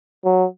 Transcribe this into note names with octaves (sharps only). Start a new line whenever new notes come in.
F#3